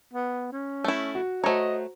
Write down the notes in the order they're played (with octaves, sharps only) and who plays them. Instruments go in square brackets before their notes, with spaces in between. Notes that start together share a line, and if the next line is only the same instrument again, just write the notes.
[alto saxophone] B3
C#4
[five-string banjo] A3 E4
[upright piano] F#4
[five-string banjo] A3 C#5 [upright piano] F#4 C5 A#5 [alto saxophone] D#5